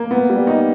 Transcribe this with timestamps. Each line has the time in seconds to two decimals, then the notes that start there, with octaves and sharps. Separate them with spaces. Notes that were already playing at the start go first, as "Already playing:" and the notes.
Already playing: A#3
0.11 B3
0.30 G3
0.47 D#4